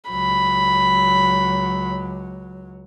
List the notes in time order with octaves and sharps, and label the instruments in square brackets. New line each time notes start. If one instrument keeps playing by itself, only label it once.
[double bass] C#2 F#3 [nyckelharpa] B5